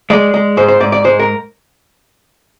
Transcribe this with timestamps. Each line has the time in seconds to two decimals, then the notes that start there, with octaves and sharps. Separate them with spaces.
0.10 G#3 D5
0.34 G#3
0.57 G#2 C5
0.68 C5
0.80 G#2 D5
0.92 D5
1.04 G#3 C5
1.19 A#4